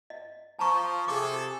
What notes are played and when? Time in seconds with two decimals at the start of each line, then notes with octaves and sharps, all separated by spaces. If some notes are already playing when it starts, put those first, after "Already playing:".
0.10 D#5
0.59 F3 A5 A#5 C#6
1.08 C3 G#4 A4 D6